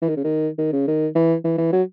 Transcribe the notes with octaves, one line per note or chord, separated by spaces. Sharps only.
E3
D#3
C#3
D#3
D#3
C#3
D#3
E3
E3
E3
F#3